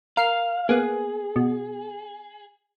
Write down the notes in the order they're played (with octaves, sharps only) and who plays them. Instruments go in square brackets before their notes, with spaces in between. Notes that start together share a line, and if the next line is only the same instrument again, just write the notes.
[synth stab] A#4 F6 C7 [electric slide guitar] F5
[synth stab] A#3 B3 [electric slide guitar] G#4
[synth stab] B2